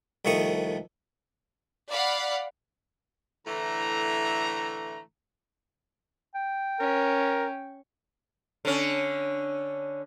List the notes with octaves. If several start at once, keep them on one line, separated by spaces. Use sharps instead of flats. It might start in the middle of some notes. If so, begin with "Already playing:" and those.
C2 D#3 F3 A3 C#6 D#6
D5 F5 F#5 B5
A2 D3 E3 A3 A#5
G5
C#4 A#4
D3 C#4